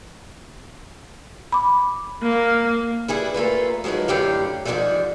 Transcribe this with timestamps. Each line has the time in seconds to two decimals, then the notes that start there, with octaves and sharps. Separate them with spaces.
1.52 B5 D6
2.23 A#3
3.08 G3 E4 G#4 B4
3.34 A3 A#3 F4 B4
3.84 F3 F#3 G#3 D#4 B4
4.08 F#2 A2 D3 G4 F5
4.65 G#2 D3 E3 F3 G3 A3